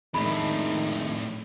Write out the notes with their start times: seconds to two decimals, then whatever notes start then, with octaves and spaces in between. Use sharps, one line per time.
0.14 F2 A2 D#3 G#3 A3 D4 B5